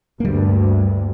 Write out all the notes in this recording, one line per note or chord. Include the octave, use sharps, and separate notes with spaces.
D2 G2 G3 A#3